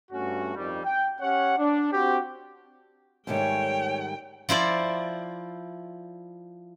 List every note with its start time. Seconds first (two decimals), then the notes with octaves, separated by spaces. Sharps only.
0.11 G2 A3 C#4 F#4
0.55 F2 D#3 G3
0.85 G5
1.21 C#4 G4 C#5 F#5
1.57 D4
1.91 C4 F#4 G4
3.27 G#2 D#3 G3 A3 C#4 C#5 G5
4.49 F3 E4 C5 D5